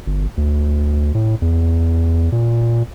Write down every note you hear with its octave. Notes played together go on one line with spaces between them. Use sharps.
G1
D2
A2
E2
A#2